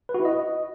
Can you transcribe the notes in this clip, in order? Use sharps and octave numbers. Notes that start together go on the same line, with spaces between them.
B4
F#4
E4
D#5